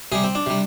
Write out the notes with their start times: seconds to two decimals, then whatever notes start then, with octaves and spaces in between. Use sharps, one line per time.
0.12 C3 G3 G#4
0.24 C4
0.35 D4
0.46 C3 G3